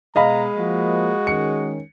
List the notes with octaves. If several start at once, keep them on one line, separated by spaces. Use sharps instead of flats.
B2 G#3 D#5 F5 A#5 B5
F3 A#3 F#4
D#3 C#4 C#7